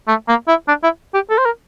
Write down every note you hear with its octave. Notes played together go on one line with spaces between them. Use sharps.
A3
A#3
E4
D4
E4
G4
A4
C5
A#4